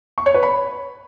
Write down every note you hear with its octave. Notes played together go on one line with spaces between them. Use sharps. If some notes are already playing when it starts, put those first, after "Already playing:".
C#6
C#5
B4
B5